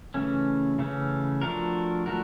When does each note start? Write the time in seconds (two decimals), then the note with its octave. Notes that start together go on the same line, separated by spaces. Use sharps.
0.14 C#3 E3 A3 C#4
0.79 C#3 E3 A3 C#4
1.41 F3 A3 D4 F#4 A#4
2.06 F3 A3 D4 F#4 A#4